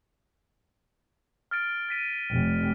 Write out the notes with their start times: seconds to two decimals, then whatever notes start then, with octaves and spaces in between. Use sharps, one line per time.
1.51 F6 A6 D7
1.89 A6 B6 D#7
2.30 F1